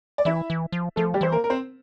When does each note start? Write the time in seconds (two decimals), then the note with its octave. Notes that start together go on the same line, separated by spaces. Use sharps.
0.18 D5
0.25 E3 E4 E5
0.50 E3
0.72 F3
0.96 F3 A3 A4
1.14 G3 G4
1.21 E3 C5
1.32 A#3 A#4
1.44 A#4
1.50 C4 C5